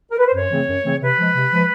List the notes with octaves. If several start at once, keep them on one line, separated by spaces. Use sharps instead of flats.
A#4
B4
C5
F#2 C#5
C#3 E3 A3 C4
F#2
C#3 E3 A3 C4
C3 B4
F3 G#3
C3
F3 G#3